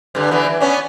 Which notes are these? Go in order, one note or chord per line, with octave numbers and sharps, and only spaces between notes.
G2 D3
D3 E3 B3
E3
B3 C#4 D4